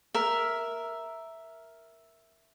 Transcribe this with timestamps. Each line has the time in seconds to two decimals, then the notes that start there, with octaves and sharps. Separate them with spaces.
0.14 A#4 E5